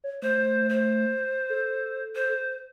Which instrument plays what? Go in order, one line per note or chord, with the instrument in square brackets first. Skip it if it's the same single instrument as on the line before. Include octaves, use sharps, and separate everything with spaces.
[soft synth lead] C#5
[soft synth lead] A3 [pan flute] C5
[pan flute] C5
[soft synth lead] A4
[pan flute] C5